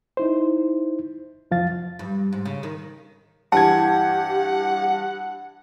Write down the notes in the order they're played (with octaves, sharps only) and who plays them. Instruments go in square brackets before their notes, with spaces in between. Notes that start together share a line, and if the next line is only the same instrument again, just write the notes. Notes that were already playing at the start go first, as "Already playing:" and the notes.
[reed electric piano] D#4 E4 C5
C2 F2 F3 F5 A6
[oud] G2
G#2
C#3
D#3
[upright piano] G2 E3 G#6 [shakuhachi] G4 [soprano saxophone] F#5 [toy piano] A5